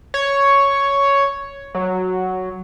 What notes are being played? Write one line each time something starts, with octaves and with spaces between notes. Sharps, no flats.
C#5
F#3